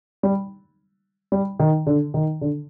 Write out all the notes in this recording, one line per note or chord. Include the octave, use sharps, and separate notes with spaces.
G3
G3
D#3
D3
D#3
D3